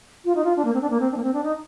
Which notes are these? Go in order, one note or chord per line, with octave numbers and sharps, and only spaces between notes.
F4
D#4
F4
D4
A#3
C4
D4
A#3
C4
D4
A#3
C4
D4
D#4